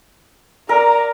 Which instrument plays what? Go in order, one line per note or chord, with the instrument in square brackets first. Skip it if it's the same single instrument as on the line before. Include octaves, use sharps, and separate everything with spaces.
[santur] A#4 [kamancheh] D5 A#5